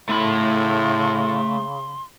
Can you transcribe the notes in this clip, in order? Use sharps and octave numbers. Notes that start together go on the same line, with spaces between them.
A2 C#3 A3 B5 C6